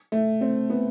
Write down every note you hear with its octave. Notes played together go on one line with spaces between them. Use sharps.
A3
C4
B3